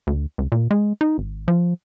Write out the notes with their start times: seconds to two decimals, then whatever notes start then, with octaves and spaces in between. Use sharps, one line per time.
0.07 D2
0.38 C#2
0.52 A#2
0.71 G#3
1.01 D#4
1.18 G#1
1.48 F3